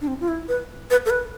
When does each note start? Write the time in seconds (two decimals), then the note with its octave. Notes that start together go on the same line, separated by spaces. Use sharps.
0.01 D4
0.08 C4
0.20 F4
0.28 E4
0.48 B4
0.90 B4
1.06 A4
1.10 B4